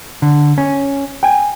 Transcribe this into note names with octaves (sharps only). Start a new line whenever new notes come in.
D3
C#4
G5 G#5